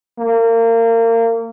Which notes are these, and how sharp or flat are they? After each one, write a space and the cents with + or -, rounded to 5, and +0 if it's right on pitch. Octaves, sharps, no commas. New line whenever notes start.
A#3 -30